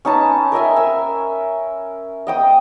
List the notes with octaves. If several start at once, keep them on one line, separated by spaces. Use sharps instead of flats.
C#4 D#4 B4 A5
A#4 D#5 E5 G#5
E6
D#5 G5 D#6